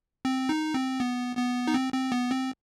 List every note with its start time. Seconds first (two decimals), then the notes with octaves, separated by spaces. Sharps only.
0.25 C4
0.49 D#4
0.74 C4
1.00 B3
1.37 B3
1.67 D#4
1.74 C4
1.93 C4
2.12 B3
2.31 C4